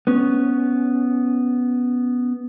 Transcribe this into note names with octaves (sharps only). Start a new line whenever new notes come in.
B3 C#4